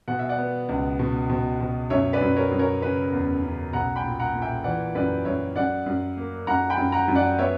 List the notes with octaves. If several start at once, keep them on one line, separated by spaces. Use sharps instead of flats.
B2 F#5
E5
D5 F#5
B3
C#2
B2
B2
B2
F#2 C#5 E5
B4 D5
F#2
A#4 C#5
F#2
A#4 C#5
C#3 B4
E2
C#3
B1 F#5 A#5
G5 B5
A#2
F#5 A#5
A#2
E5 G5
E3 D5 F#5
F#2 B4 D5
F#2 C#5 E5
F#2 D5 F#5
F#2
A#3
F#2 F#5 A#5
G5 B5
F#2
F#5 A#5
F#2
D5 F#5
B3 C#5 E5